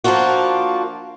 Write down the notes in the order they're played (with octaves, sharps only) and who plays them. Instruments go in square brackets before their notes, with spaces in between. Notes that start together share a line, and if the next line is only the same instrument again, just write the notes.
[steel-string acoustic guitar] F3 A#3 D4 F4 F#4